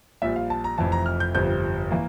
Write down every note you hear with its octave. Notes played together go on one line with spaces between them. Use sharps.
A#1 A#2 G3 E5
F5
A5
A#5
F1 F2 E3 A5
A#5
F6
G6
G1 F2 C3 F3 G6
E3 A#3